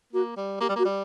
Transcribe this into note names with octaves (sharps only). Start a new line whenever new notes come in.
A#3 F#4
G3
A#3 G4
G3
A#3 F#4
G3